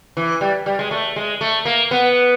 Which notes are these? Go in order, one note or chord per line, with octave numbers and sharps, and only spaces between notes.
E3
G3
G3
G#3
A3
G#3
A3
A#3
B3